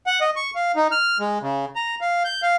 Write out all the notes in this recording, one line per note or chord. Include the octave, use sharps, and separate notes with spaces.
F#5
D#5
C#6
F5
D#4
F6
G#3
C#3
A#5
F5
G6
F5